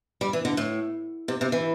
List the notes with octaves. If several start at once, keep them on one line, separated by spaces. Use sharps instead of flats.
G3
E3
D3
A2
C3
C3
E3